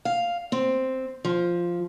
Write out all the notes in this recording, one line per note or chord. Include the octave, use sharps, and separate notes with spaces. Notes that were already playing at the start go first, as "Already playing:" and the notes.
F5
C4
F3